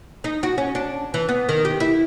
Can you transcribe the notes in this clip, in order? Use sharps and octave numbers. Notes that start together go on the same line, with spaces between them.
D#4
F#4
C#4
D4
E3
B3
D#3
G4
E4